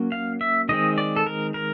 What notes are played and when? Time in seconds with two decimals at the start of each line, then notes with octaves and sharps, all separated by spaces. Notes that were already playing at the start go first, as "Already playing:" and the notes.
Already playing: F#3 A#3 C#4
0.12 F5
0.41 E5
0.69 D#3 G#3 C4 D#5
0.98 D5
1.16 A4
1.27 A#4
1.54 A#4